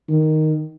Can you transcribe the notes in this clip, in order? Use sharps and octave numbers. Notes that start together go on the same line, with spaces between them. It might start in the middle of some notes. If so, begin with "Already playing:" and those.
D#3